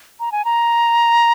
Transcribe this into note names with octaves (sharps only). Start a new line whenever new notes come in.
A#5
G#5
A#5